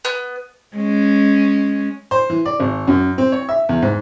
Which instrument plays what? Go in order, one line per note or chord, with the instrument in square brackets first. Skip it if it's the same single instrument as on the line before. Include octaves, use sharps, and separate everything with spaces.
[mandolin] B3
[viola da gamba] G#3 C#4
[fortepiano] C5
E3
D5
G#1
F#2
C4
C#5
E5
E2
G#2